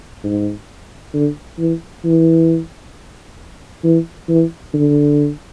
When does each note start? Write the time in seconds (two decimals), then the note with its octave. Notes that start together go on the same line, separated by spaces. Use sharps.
0.24 G#2
1.13 D3
1.59 E3
2.04 E3
3.84 E3
4.29 E3
4.74 D3